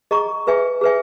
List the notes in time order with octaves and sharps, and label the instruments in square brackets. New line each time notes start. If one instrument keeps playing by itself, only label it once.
[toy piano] G#4 D#5 A#5 C#6
G#4 B4 E5 G#5
G#4 B4 E5 G#5